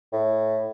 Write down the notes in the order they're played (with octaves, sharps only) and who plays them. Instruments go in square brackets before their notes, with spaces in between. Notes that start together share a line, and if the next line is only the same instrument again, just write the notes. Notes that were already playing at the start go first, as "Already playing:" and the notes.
[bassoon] A2